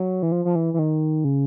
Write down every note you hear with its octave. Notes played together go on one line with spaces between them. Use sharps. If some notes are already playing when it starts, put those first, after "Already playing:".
Already playing: F#3
E3
F3
F3
E3
E3
D#3
C#3